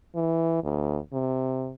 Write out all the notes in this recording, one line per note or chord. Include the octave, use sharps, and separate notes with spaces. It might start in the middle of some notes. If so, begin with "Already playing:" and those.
E3
D2
C3